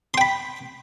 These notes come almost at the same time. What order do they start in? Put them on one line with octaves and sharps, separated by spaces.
C6 G5 B5